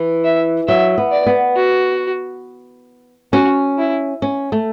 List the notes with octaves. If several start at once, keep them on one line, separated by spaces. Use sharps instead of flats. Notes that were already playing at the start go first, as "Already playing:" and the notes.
Already playing: E3
E5
F#3 E5
B3
D5
B3
F#4
C#4 F#4
E4
C#4
A3